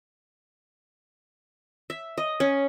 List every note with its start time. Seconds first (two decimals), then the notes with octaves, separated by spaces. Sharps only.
1.90 E5
2.18 D#5
2.40 C#4